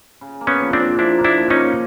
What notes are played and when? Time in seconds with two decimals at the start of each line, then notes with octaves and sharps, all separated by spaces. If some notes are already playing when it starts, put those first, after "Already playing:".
0.21 C#3
0.41 A#3
0.47 B3 C#4
0.60 F3
0.73 C4 D4
0.80 F3
0.99 F3 D4 E4
1.18 A#3
1.24 D4 E4
1.38 F3
1.50 C#4 D#4
1.56 A#3